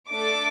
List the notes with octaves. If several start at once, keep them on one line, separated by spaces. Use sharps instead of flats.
A3 D4 A4 D6